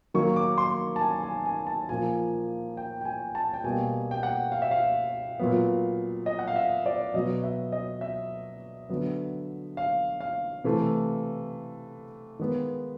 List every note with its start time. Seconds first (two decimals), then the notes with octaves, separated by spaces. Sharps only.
0.14 D#3 F#3 A#3 C#6
0.36 D6
0.58 C6
0.96 A5
1.01 G#5
1.23 G#5
1.45 G#5
1.67 A5
1.89 A#2 F3 A#3 G#5
2.77 G5
3.01 G5
3.05 G#5
3.35 A5
3.54 G5
3.64 B2 G3 A#3 G#5
4.11 G5
4.23 F#5
4.52 F5
4.62 E5
4.71 F5
5.39 A#2 F#3 B3
6.26 D#5
6.39 F#5
6.48 F5
6.56 E5
6.86 D5
7.14 B2 F#3 B3 D#5
7.44 E5
7.72 D#5
8.01 E5
8.89 D3 F#3 B3
9.77 F5
10.21 F5
10.64 C3 E3 A3
12.39 D#3 G#3 B3